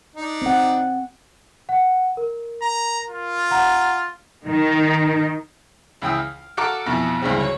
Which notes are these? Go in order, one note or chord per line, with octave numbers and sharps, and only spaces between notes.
D4 D#4
C4 F#5
F#5
A#4
A#5
F4
F#5 A#5
D#3
C#2 E3 G5 D#6 E6
F5
F#4 A4 A#4 F5 A#5 D6
F2 B2 E3
C#2 G2 D3 E3 G#3 C4
F#3 C#5